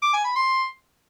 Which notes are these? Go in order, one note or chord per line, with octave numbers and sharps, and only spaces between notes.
D6
G#5
B5
C6